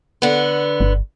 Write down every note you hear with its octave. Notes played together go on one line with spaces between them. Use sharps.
D3 B3
G1